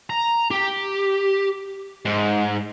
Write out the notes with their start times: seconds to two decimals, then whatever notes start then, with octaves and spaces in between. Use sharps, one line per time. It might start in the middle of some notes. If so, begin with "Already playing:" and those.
0.10 A#5
0.51 G4
2.05 G#2